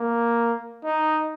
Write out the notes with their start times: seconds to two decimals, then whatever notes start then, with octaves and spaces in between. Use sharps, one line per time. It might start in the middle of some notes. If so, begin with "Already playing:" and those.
Already playing: A#3
0.85 D#4